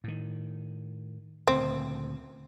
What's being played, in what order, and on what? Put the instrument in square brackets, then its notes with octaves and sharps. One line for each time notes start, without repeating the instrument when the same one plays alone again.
[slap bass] A2 D#3
[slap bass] D2 A#2 C#3 [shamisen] C4